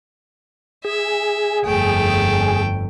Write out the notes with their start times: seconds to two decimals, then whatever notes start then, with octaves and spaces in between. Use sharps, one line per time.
0.85 G#4 E5
1.65 G1 F2 A3 G5